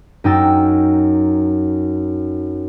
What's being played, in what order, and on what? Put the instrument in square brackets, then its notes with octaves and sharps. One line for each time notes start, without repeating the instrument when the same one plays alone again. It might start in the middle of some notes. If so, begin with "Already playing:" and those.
[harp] F#2 D#4 G5 E6 A6